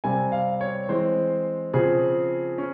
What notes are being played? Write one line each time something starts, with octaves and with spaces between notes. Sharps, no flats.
C3 G3 C4 G#5
F5
C#5
E3 G#3 C4 C5
C#3 F3 C4 G#4
C#4